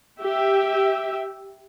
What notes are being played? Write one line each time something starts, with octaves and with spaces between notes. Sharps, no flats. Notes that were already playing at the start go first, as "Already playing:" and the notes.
G4 E5